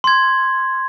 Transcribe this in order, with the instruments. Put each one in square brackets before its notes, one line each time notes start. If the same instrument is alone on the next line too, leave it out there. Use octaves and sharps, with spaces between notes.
[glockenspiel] C6 G#6